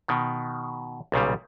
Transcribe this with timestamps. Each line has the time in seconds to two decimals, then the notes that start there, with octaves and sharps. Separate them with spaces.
0.08 B2 D#3
1.12 B1 A#2 C#3 G3